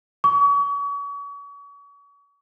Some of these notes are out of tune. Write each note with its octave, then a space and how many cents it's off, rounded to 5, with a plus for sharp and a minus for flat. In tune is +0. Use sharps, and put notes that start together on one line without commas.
C#6 +40